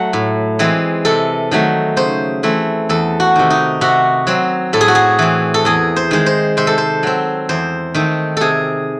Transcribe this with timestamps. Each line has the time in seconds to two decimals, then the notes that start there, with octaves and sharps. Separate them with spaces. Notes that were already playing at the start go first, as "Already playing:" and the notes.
Already playing: F#3 A3 F#5
0.13 A2
0.59 E3 G#3 C4
1.05 C3 A4
1.51 D#3 F#3 A3
1.97 C#3 C5
2.43 E3 A3 C4
2.89 E2 A4
3.20 F#4
3.36 C3 D#3
3.50 D#4
3.81 C3 F#4
4.27 F#3 C4
4.73 A2 A4
4.81 G#4
4.88 F#4
4.95 G#4
5.19 E3 C4
5.54 A4
5.65 E2 G#4
5.96 C5
6.11 D#3 G#3
6.26 C5
6.57 C3 C5
6.67 A4
6.78 C5
7.03 F#3 C4
7.49 E2 C5
7.95 D#3 A3 C4
8.37 C3 G#4 A4